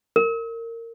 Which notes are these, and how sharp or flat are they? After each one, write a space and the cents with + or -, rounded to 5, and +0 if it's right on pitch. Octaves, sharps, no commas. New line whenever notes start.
A#4 -25